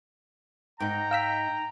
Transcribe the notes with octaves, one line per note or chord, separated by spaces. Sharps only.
G#2 D#4 G5 A#5
F5 G5 E6 B6